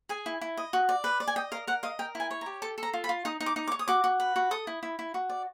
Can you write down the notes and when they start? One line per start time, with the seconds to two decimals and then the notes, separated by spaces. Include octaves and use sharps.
0.09 G#4 G#5
0.26 E4
0.41 E4
0.57 D#5
0.73 F#4
0.89 D5
1.04 B4
1.20 D5
1.28 G#5
1.36 D#5 G5
1.52 A#4 F5
1.67 A#4 F#5
1.83 D#5 F5
1.99 A#4 G5
2.15 E4 G#5
2.31 C#5
2.41 A#5
2.46 G4
2.62 A4 A5
2.78 A4
2.83 A#5
2.93 F4
3.04 B5
3.09 F4
3.25 D#4 D#6
3.40 D#4
3.46 D6
3.56 D#4
3.68 D6
3.72 C#5
3.79 D#6
3.88 F#4 D6
4.04 F#4
4.20 B4
4.36 F#4
4.51 A4 D#6
4.67 E4
4.83 E4
4.99 E4
5.14 F#4
5.30 D5